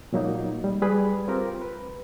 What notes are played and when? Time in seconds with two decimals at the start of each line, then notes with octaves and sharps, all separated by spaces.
0.13 A#2 F#3 A#3 D#4
0.64 G3
0.82 G3 G#4 B4 B5
1.28 C4 F4 G4 A#4
1.61 B4